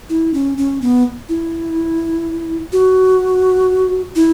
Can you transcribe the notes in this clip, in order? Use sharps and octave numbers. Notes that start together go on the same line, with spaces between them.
E4
C#4
C#4
B3
E4
F#4
E4